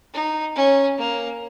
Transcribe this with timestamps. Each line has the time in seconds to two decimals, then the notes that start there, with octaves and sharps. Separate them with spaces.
0.13 D#4
0.55 C#4
0.98 A#3